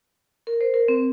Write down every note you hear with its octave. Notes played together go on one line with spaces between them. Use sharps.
A#4
C5
A#4
C4